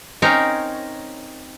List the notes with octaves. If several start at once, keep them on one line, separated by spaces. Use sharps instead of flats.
C4 C#4 D#4 A#4 C#5